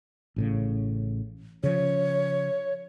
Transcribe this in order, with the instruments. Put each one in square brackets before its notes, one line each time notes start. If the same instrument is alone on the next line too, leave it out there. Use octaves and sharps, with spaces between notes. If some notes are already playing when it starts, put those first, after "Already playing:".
[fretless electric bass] A1 A2 C#3
[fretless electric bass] C#3 F3 [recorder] C#5